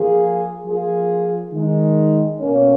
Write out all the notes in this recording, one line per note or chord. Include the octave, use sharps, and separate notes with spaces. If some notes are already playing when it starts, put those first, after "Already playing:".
Already playing: F3 A#3 F4 G#4
F3 A#3 F4 G#4
D#3 G#3 D#4
B2 A#3 C#4